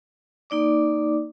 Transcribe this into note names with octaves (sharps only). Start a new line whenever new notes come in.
A#3 D#4 D5 D6